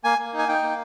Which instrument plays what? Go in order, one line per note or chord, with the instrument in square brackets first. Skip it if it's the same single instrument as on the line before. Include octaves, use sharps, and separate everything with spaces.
[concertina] A#3 G#5
A#3
D#4
G#5
D#4 G5
A#3